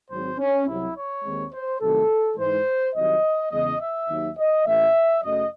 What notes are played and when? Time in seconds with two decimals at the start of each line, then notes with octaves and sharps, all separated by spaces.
0.09 G#1 G#2 F#3 C4 C5
0.38 C#4
0.67 C2 C3 F#3 E4
0.96 C#5
1.24 D#2 D#3 G#3 C4
1.53 C5
1.80 C2 C3 D#3 F#3 A3 A4
2.37 G#2 E3 G#3 C5
2.94 C2 C3 D#3 F#3 D#5
3.51 E2 C#3 G#3 D#5
3.80 E5
4.09 D#2 D#3 F#3
4.37 D#5
4.66 A1 A2 E3 A3 E5
5.22 F#2 C#3 F#3 A3 D#5